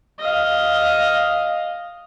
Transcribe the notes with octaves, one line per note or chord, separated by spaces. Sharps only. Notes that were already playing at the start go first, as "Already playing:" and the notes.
D#5 F5